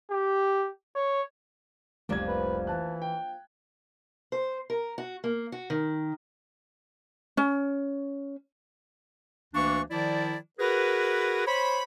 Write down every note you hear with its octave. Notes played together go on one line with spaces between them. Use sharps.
G4
C#5
F1 C2 F3 A#3 D4 G#6
B4
E3 A5 F#6
G5
C5
A#4
F#4
A#3
F#4
D#3
C#4
D2 E3 A#3 D4 C#6
D#3 F3 E4 D5
F#4 G#4 A#4 B4
C5 C#5 B5